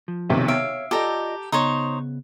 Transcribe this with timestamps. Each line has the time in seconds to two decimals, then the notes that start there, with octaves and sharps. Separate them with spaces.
0.08 F3
0.30 B1 C3 D#3
0.48 C#5 E5 F5 D7
0.91 F4 G4 A4 D5 D#5 A#5
1.52 C#3 B3 D#4 C5 C#5